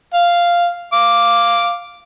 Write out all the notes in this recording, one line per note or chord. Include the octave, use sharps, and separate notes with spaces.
F5
F5 D6